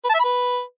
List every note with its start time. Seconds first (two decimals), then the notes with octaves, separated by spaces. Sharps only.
0.04 B4
0.09 A5
0.14 E5
0.19 B5
0.24 B4